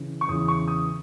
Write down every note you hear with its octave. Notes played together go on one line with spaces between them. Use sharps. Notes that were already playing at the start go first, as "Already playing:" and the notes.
Already playing: C#3 E3
C#6
E2 C#3 E3 D#6
C#6
D#6